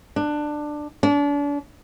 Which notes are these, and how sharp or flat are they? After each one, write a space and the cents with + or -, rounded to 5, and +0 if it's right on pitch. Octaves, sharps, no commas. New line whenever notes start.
D4 +15
D4 -35